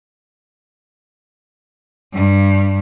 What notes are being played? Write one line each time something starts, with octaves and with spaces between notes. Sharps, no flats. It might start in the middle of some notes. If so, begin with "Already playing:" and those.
G2